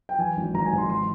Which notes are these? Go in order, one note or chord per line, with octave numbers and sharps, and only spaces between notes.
G5
E3 G#5
G#1
G#1 A#5
G#5
G#2
C6
E3 C6